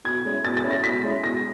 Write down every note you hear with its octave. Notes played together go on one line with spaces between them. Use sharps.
B2 G#6
G#3 C#4 E4
B2 A6
A6
G#3 C#4 E4
A#6
B2 B6
G#3 C#4 E4
B2 A#6